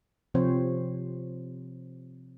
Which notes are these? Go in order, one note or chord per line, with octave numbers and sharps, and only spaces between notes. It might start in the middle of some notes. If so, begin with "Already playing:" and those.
C3 F3 C4 C5 C#5